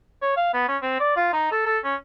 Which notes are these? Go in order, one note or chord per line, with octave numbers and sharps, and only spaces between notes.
C#5
F5
B3
C#4
C4
D5
F4
D#4
A4
A4
C#4